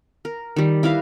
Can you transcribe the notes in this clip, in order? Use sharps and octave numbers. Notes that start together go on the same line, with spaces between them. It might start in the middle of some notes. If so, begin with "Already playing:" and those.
A#4
D#3 G3
E4 A#4 B4 F5